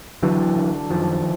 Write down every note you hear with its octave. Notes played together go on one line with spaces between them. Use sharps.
D3 E3 F#3
D3
F#2 D#3 F3